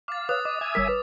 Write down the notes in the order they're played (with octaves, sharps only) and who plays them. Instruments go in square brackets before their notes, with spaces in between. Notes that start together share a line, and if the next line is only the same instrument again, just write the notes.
[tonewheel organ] F5 [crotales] D6 A6
[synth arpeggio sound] B4 C#5 E6 [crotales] D#6 [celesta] F#6
[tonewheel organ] D#5 [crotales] D6
[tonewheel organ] E5 G#5 D#6
[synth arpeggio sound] G1 G3 A#4 [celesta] C#5 E6 B6
[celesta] B4